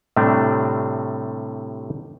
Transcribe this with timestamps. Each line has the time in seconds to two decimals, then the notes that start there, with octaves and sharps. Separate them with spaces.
0.16 A2 C3 G3 A3 C4 D4